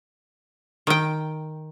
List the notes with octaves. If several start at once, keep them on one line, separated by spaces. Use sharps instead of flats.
D#3 G5